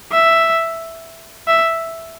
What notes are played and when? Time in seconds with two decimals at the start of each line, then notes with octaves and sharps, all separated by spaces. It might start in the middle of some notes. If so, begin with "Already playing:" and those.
0.12 E5
1.48 E5